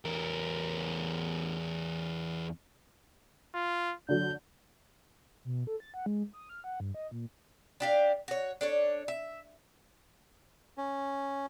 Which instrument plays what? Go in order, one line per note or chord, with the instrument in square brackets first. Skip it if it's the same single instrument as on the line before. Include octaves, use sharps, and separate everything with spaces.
[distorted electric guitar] E2 A#4
[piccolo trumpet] F4
[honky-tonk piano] D3 F#3 [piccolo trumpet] G6
[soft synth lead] B2
A4
A6
F#5
G#3
D#6
F6
F#5
G2
D#5
A#2
[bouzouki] D4 G4 F5
F#4 C#5
D4 A4 C#5
E5
[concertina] C#4